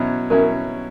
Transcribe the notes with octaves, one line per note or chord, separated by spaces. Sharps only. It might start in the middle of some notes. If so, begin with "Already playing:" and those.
Already playing: B2 F#3 C#4 E4
B2 F#3 C#4 E4 A#4